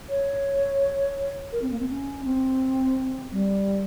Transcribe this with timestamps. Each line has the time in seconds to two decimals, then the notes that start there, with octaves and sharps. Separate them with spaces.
0.09 C#5
1.52 A#4
1.62 C4
1.71 A#3
1.79 C4
1.89 C#4
2.24 C4
3.32 G3